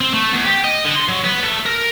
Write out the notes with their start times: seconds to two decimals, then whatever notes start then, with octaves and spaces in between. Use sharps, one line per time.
0.01 C4
0.14 A3
0.33 E2
0.45 G4
0.64 D#5
0.84 D3
0.96 C6
1.08 F#3
1.24 B3
1.43 A3
1.66 A#4